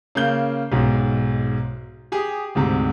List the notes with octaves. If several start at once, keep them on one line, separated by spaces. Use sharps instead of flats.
C#3 A#3 G6 G7
B1 G#2
G4 G#4 D#6
D2 G#2 C3